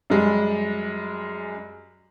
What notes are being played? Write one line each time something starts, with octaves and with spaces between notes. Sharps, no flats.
F#2 G3 G#3